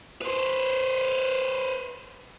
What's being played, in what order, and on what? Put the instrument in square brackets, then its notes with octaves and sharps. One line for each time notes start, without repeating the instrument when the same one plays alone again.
[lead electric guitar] B4 C5